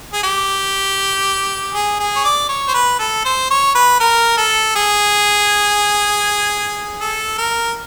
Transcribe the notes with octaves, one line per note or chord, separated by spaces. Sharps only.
G#4
G4
G#4
G#4
C#5
D5
C#5
C5
B4
A4
C5
C#5
B4
A#4
A4
G#4
A4
A#4